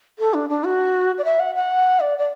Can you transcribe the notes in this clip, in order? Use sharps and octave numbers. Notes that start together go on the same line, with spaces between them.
A4
D4
D4
F#4
D5
E5
F#5
F#5
D5
D5